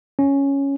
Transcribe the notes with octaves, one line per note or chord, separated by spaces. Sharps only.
C#4